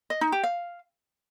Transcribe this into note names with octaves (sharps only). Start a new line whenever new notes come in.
D#5
D#4
G4
F5